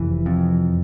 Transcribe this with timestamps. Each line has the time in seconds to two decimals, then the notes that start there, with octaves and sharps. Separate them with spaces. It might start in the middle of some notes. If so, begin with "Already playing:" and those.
Already playing: F1 E3
0.26 F2